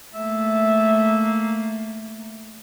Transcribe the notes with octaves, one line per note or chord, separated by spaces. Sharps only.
A3 A#3 E5